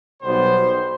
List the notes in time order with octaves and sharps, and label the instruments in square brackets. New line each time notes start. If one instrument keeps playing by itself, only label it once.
[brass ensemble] B1 B2 G3 B3 C5